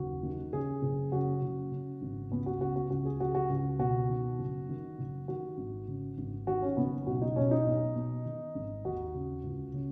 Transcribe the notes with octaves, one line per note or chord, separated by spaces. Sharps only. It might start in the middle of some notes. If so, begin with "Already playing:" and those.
Already playing: F#1 D#2 F#4
D#3
C#3 G#4
F#1
C#3 F#4
F#1
C#3
G#1
C#2 B3
F#4
C#3 F#4
F#4
C#2 F#4
G#4
C#3 F#4
F#4
C#2
B2 F#4
D#3
F#1
D#3
F#1
D#3 F#4
G#1
C#3
G#1
D#3 F#4
C#4
F#1 B3
B1 F#4
D#4
B2 C#4
D#4
B1
B2
D#3
G#1
D#2 F#4
C#3
C#2
C#3